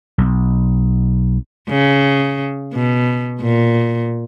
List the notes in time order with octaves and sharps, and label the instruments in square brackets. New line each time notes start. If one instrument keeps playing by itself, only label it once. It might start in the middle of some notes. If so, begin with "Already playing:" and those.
[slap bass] B1
[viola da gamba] C#3
B2
A#2